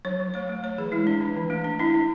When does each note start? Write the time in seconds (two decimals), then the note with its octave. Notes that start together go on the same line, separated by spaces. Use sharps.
0.05 F#3 C#5
0.20 F#3
0.34 A3 C#5
0.49 A3
0.63 A3 C#5
0.78 E3 G#4
0.92 G#3 E4
1.07 D4
1.21 E3 D4
1.37 E3
1.50 A3 D4
1.64 D4
1.79 D4 E4
1.94 D4